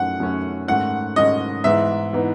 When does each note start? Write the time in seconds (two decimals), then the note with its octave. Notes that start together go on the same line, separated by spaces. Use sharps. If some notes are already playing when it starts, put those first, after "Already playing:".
Already playing: F#2 D#3 A3 C#4 F#5
0.20 F#2 D#3 A3 C#4
0.68 G#2 D#3 A3 C#4 F#5
1.16 G#2 D#3 A3 C#4 D#5
1.64 G#2 E3 B3 D#4 E5
2.13 E3 B3 D#4